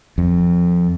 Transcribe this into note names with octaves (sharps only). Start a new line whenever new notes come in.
F2